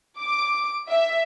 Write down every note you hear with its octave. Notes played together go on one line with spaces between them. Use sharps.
D6
E5